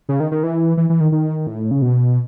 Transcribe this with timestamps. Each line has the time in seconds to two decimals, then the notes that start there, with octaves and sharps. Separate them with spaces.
0.09 C#3
0.20 D#3
0.32 D#3
0.43 E3
0.77 E3
0.90 E3
1.01 D#3
1.12 D#3
1.47 A2
1.71 C#3
1.82 B2